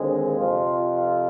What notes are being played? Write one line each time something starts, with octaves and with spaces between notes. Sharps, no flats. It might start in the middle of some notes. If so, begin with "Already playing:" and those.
Already playing: D#2 D3 G#3 C4
F2 C3 F3 F4
F4